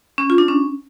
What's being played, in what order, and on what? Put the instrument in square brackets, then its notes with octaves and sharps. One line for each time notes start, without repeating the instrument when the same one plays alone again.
[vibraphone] C#4
F4
D4
C#4